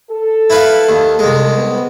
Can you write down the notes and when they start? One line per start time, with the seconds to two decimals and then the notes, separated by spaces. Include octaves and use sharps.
0.11 A4
0.50 E4 B4 F5
0.89 D#2
1.19 C2 G#3
1.55 B3